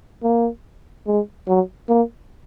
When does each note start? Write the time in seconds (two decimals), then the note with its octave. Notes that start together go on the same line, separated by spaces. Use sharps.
0.23 A#3
1.07 G#3
1.48 F#3
1.89 A#3